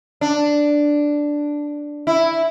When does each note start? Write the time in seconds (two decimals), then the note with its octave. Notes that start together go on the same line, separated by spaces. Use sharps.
0.21 D4
2.07 E4